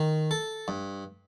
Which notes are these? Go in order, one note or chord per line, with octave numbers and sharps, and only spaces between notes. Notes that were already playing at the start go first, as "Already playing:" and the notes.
Already playing: D#3
A4
G2